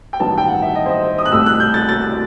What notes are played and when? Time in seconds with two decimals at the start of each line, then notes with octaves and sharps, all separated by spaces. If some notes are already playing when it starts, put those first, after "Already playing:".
0.13 G5
0.19 A1 G2 D#3 F#3 B3 A5
0.38 G5
0.48 F#5
0.62 E5
0.75 D#5
0.86 C5
0.89 D#5
1.19 D#6
1.25 F#6
1.32 C2 B2 A3 E6
1.46 F#6
1.60 G6
1.74 A6
1.89 A6